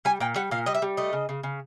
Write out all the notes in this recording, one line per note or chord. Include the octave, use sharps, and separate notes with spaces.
G3 G#5
A#2 G5
G3 F#5
A#2 F5
G3 D#5
E5
G3
A3 D#5
C#3
C#3
C#3